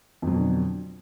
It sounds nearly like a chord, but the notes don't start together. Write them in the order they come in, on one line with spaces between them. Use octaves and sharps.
F2 F#3 B2 D3